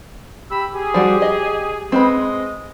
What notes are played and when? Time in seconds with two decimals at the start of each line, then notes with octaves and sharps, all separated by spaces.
0.49 G4 B5 E6
0.74 G4 G#4
0.94 F3 G3 F#4
1.22 D#5
1.92 G#3 C4 B4 D#5 B5